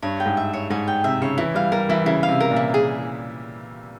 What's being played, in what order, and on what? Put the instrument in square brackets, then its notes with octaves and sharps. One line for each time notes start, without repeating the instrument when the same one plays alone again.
[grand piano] G2 [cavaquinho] C#5
[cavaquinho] G5
[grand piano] G#2
[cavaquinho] E5
C#5
[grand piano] G#2 [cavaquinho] C#5
[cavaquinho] G5
[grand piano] C3 [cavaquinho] E5
[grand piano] C#3 [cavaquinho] C#5
[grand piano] E3 [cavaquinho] E4
[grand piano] G3 [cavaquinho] F5
[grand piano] G3 [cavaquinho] A#4
[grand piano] E3 [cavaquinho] E4
[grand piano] C#3 [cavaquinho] E4
[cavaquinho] F5
[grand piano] C3
[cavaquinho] A#4
[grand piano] A#2
[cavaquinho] E4
G#4